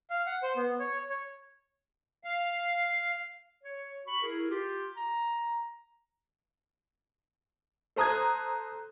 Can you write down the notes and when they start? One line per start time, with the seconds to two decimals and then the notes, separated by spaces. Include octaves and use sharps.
0.10 F5
0.26 F#5
0.43 C5
0.57 B3
0.79 C#5
1.10 C#5
2.24 F5
3.63 C#5
4.06 F#4 B5 C#6
4.22 E4 G#4 A#4
4.49 F4 G4
4.97 A#5
7.96 A4 C5 A#5 D#6 F#6 G#6